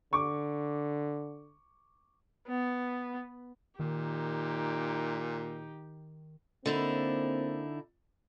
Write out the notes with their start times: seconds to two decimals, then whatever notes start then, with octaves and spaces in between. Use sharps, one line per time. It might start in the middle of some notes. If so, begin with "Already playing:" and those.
0.13 D3 C#6 D6
2.48 B3
3.80 A#2 D#3 D#4 G4
6.66 D3 A#3 C4 D#4 E4